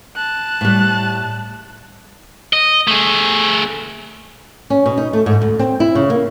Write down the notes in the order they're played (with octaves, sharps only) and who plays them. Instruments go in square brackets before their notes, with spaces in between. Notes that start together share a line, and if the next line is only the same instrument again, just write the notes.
[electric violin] A5 F#6
[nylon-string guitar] A2 G3
[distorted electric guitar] D#5
A3 G#4
[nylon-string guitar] C#4
B2
D#4
A3
G#2
D2
C4
E4
C#3
A#3